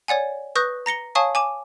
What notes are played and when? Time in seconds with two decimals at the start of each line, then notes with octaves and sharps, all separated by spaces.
0.08 C#5 D5 F#5 G#5
0.56 B4 C#6 D#6 F#6 G6 A#6
0.86 A#5 A#6 C#7 G7
1.15 C#5 F5 G#5 A5 C#6 D#6
1.35 G#5 D6 E7